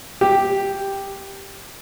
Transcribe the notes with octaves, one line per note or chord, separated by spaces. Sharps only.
G4